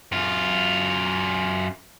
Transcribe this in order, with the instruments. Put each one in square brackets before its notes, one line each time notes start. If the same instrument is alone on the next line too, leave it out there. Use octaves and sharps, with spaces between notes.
[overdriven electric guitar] F#2 F4